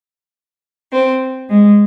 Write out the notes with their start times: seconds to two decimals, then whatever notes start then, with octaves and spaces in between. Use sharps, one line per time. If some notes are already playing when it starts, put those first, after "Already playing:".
0.91 C4
1.49 G#3